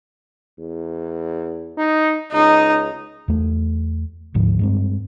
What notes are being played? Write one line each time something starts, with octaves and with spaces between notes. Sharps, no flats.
E2
D#4
C#2 D#4
E2 A3
G1 D2 G#2 F3
G2 G#3 C4